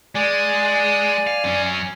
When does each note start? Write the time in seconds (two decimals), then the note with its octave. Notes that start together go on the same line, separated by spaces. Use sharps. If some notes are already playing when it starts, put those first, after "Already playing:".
0.15 G#3 D5 G#5
1.27 F5
1.44 F#2 C#4